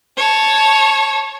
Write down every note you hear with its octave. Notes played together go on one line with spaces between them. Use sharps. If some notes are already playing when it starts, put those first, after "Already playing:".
C#5 A5